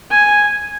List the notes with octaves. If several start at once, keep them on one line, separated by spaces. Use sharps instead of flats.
G#5